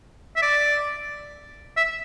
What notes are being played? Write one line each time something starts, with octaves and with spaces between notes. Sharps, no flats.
E5
D5
E5